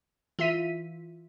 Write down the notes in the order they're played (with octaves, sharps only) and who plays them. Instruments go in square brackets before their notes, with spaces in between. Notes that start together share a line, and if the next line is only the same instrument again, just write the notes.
[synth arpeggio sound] E3 F4 E5 B6 D#7